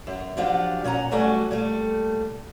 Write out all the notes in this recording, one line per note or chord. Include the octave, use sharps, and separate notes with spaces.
F#2
F3 F#3 D4 F4 G4 F#5
A#2 C#4 F#5 A#5
F#3 G3 A3 F#4 D5 G#5
A#2 G3 A3